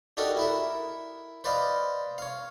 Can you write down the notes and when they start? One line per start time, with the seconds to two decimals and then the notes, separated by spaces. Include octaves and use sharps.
0.17 D4 D#4 F#4 G4 A4 A#4
0.37 E4 A#4 E5
1.44 B4 C5 D5 D#5 F5
2.18 C#5 F5